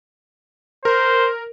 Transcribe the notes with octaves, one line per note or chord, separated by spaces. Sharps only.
A#4 C5